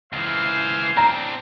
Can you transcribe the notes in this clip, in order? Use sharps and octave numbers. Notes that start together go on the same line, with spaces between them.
C#2 E3 G#4 C5 F5
C4 D4 A#5